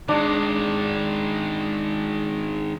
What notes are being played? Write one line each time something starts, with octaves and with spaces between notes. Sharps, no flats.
D#3 G#3 D4 D6